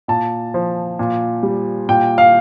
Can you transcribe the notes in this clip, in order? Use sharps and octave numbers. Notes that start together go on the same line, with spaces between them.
A#2 A5
F3
A#2
G3
A#2 G5
F5